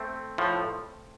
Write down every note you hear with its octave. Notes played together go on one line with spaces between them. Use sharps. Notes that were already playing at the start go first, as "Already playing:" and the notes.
Already playing: A3 C4
A2 F3